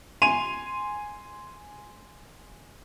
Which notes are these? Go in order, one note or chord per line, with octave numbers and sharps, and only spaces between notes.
G#5 C6 D#7 F7